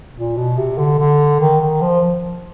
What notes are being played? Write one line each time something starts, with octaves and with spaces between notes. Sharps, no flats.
A#2
B2
C3
D3
D3
D#3
D#3
F3